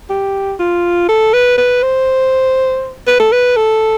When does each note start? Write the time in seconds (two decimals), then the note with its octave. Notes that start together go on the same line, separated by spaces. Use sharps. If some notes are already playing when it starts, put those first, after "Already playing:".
0.10 G4
0.59 F4
1.09 A4
1.33 B4
1.57 B4
1.83 C5
3.07 B4
3.20 A4
3.32 B4
3.56 A4